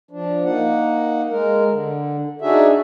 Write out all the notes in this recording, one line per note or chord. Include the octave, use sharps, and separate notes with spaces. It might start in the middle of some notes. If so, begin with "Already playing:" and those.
F3 D4
A#3 D#4 F#5
G#3 A#4
D3
D4 D#4 F#4 G#4 E5